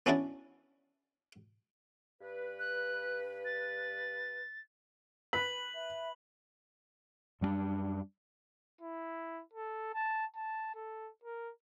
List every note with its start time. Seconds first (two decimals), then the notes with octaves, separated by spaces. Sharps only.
0.06 B3 C#4 D4 E4 F#4 D5
2.21 G2 B4
2.59 F#6
3.45 A6
5.33 B4 B6 F#7
5.75 E5
7.41 F#2 G3 A#3 D4
8.81 E4
9.53 A4
9.94 A5
10.35 A5
10.75 A4
11.23 A#4